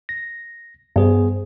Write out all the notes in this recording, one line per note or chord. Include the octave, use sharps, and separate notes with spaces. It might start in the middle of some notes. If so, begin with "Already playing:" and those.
A#6
G2 B3 G#4 C5